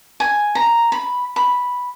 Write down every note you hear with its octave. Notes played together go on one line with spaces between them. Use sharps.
G#5
A#5
B5
B5